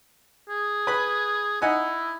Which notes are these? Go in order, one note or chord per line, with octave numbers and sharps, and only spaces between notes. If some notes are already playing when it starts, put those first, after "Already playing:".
G#4
B4 B5
D#4 E4 F#5 G#5